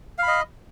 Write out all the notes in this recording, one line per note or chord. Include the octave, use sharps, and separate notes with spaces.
D#5 F5 B5